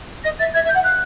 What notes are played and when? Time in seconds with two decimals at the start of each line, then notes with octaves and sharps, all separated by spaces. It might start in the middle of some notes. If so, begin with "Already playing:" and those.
0.24 D#5 A#6
0.39 E5 A6
0.54 E5 G#6
0.64 E5
0.69 G6
0.74 F#5
0.84 F5 F#6